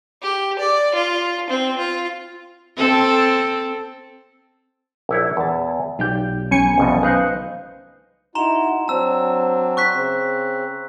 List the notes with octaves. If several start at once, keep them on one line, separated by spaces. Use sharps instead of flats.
G4
D5
F4
C4
F4
C4 A4
A#1 E4 C#5
E2 A5
B1 F4 G4 D5 G6
B1 C#4 G#5 C#7
C2 F2 B2
D#4 B4 C5 F5 F#6
D#4 E4 F#4 A#5 C6 E7
F#3 C4 D4 A5 E6
C#6 F#6 B6
C#3 C4